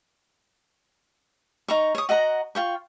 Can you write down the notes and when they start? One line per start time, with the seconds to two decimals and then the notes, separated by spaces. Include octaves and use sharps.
1.68 D#4 A#5 C#6
1.95 C#5 D#6
2.09 F#4 D#5 F#5 A#5
2.55 F4 G5 C#6